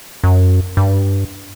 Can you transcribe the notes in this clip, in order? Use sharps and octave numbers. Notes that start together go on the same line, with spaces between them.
F#2
G2